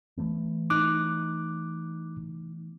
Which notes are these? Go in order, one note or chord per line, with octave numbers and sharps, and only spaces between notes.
E3 A3 B3
D#4 D6 F#6